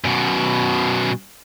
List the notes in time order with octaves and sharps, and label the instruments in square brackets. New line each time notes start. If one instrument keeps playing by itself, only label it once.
[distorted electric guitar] F#2 B2